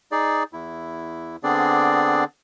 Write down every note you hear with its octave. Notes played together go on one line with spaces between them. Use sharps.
D#4 G#4 D5
E2 E4
D3 B3 C4 D4 G#4 D5